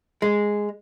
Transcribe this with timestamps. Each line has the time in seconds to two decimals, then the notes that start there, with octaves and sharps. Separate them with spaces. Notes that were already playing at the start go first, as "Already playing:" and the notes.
0.22 G#3